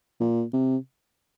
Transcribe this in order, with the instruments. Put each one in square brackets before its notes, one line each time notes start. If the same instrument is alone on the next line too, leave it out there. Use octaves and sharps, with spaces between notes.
[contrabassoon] A#2
C3